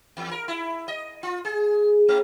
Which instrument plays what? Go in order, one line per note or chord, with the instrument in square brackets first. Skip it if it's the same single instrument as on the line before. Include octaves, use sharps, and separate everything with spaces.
[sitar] E2
A#4
E4
D#5
F4
G#4
A#3